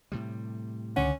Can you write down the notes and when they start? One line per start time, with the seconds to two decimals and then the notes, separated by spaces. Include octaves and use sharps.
0.12 A2 C3 G3
0.96 C#2 D3 C#4 F#5